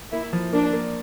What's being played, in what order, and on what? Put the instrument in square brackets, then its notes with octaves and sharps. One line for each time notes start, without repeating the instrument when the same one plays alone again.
[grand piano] A#3 [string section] E4
[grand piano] F3
[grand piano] A#3 [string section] D4
[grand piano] A#3